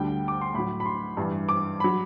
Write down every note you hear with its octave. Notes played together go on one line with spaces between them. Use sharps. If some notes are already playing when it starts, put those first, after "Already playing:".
Already playing: D2 D3 G3 G5
D6
C6
A2 F#3 B5
B5
C6
G2 E3 G3
D6
F#3 B5